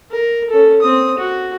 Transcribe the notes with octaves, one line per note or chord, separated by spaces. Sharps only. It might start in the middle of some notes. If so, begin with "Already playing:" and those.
A#4
C#4 A4
C4 D#6
F#4